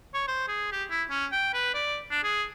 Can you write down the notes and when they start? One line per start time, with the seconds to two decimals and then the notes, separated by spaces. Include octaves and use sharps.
0.14 C#5
0.28 C5
0.48 G#4
0.72 G4
0.91 E4
1.10 C#4
1.32 G5
1.54 B4
1.74 D5
2.11 D4
2.24 G#4